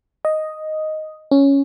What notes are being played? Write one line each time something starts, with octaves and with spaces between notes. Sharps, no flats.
D#5
C#4